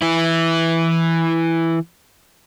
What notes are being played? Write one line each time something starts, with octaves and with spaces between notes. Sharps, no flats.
E3 E4